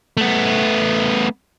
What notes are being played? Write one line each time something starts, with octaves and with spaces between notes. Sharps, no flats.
A3 B3